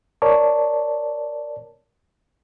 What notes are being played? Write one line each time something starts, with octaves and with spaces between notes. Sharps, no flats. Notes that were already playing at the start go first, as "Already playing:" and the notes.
A#4 C#5 D5 A5